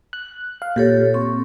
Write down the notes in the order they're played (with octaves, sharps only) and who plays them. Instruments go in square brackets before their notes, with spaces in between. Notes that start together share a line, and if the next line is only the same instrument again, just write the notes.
[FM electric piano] F#6
F5
[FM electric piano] A#2 [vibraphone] G4 A4 C#5
[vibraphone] C4 C#6